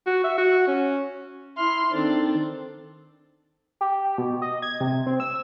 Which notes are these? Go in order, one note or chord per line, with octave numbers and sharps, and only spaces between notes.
F#4
E5
F#4
C#4
E4 C6 F6
D#3 C4 D4 A4
G4
B2
D#5
G#6
C3
C4
E6